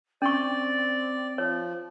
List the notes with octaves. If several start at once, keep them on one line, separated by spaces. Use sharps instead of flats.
C4 C#4 D5 C#6
F3 C#5